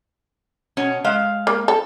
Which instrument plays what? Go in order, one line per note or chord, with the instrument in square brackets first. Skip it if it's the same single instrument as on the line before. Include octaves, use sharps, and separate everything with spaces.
[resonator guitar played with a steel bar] B2 C#4
G#3 F5
[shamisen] A#3
A4